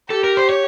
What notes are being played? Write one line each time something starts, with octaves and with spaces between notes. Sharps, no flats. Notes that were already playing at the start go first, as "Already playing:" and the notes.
G4 A4
A#4
C5
C#5